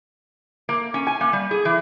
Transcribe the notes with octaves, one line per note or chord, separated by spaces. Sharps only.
A#3
C#4
G#5
A#3
G3
G#4
E3